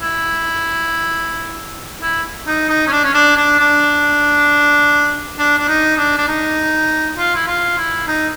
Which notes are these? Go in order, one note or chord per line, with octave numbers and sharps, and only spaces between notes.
E4
E4
D#4
D#4
C#4
D4
C#4
D4
D4
D4
D4
D4
D#4
D4
D4
D#4
F4
E4
F4
E4
D#4